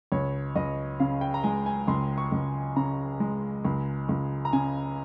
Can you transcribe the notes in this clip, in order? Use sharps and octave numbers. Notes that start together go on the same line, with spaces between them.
C#2 C#5
C#2 D#5
C#3 F5
G5
A#5
G#3 G#5
G#5
C#2 C6
C#6
C#2
C#3 A#5
G#3
C#2
C#2
A#5
C#3 G#5